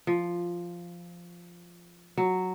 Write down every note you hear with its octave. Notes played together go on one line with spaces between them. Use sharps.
F3
F#3